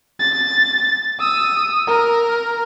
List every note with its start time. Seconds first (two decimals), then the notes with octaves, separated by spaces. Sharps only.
0.20 A6
1.20 D#6 E6
1.87 A#4